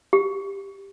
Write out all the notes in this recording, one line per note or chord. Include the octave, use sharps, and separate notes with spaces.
G4